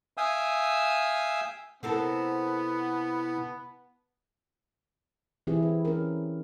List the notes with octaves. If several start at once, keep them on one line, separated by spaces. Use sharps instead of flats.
E5 F5 G5 G#5 D#6 E6
C3 B3 C4 E4 A4 A#4 F#5 A5
E3 C4 E4 G4 G#4
B4
C#4 A#4